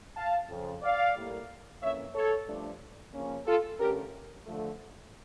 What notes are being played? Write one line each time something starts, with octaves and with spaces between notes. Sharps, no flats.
F5 A5
F2 C#3 F3
D5 F5
A2 G3 A#3
F2 E3 A#3 C#4 C#5 E5
A4 C#5
G2 F3 A3 D4
C#3 F3 A#3 C#4
F4 A4
G2 D3 A3 C#4 G4 A#4
D3 F3 A3